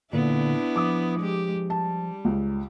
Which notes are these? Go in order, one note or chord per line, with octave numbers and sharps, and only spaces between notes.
A#2 D3 B3 D4 E4
F3 D6 D#6
G#3 G4
G3 A5
C#2